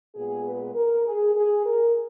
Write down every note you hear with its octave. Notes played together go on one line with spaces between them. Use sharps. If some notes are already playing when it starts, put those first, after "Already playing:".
A#2 G#3 B3 G#4
B4
A#4
G#4
G#4
A#4